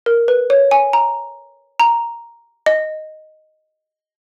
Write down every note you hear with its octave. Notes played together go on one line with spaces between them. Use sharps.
A#4
B4
C#5
G#5
A#5
A#5
D#5